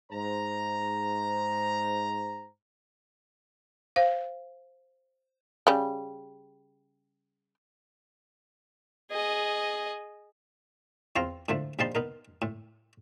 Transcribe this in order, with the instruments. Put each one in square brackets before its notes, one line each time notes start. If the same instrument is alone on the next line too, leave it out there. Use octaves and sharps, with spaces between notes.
[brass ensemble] G#2 C5 A#5
[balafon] C5 F5
[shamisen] C#3 G3
[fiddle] G#4 D#5
[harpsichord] E2 C4 F4 F5 A#5
A2 D3 F3 A3
A#1 F3 G3 D#4 A5 C6
B3 D#4 A#4
A2